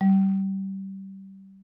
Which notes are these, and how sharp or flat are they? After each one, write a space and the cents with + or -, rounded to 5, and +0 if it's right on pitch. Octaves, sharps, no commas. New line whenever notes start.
G3 -20